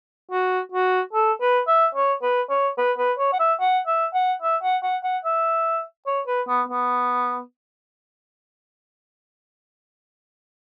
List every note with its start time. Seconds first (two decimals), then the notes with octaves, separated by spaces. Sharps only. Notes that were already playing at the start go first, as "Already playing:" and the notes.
0.31 F#4
0.72 F#4
1.13 A4
1.41 B4
1.67 E5
1.94 C#5
2.22 B4
2.50 C#5
2.78 B4
2.98 B4
3.19 C#5
3.33 F#5
3.39 E5
3.60 F#5
3.87 E5
4.14 F#5
4.42 E5
4.63 F#5
4.83 F#5
5.03 F#5
5.24 E5
6.06 C#5
6.27 B4
6.48 B3
6.68 B3